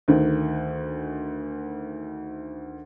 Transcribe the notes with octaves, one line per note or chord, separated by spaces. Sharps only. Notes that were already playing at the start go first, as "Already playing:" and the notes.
D2 D#3